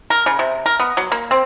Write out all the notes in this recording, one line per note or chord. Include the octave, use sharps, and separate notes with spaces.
A#4
C#3
C3
A#4
B3
F#3
A#3
C4